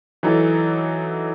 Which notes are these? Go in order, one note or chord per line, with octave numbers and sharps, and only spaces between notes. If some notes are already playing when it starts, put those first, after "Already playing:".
E3 F#3 D#4 A4